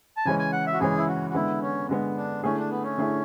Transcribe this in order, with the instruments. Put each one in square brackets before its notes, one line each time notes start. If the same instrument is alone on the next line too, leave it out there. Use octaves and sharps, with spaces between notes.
[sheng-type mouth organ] A5
[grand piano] C#3 E3 G#3 C#4 [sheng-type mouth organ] G#5
[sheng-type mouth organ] G#5
F#5
E5
F#4
[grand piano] C#3 E3 G#3 C#4 [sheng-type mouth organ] G#4
[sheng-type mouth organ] E4
F#4
F#4
[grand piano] D3 G#3 B3 [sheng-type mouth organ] E4
[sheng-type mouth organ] C#4
[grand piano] D3 G#3 B3
[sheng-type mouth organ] D4
[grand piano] D3 A3 E4 G#4 [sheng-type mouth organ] C#4
[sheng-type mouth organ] D4
B3
C#4
[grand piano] D3 A3 E4 G#4